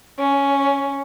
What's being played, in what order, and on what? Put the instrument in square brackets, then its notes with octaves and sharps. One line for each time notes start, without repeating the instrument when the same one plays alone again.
[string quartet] C#4